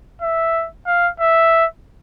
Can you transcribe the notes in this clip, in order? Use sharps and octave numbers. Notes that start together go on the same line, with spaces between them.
E5
F5
E5